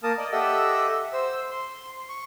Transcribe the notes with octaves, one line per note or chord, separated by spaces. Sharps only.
A#3 A#4 A5 D#6
D5 D#5
G4 A4 D#5 E5 F#5 E6
C5 E6
C6
C#6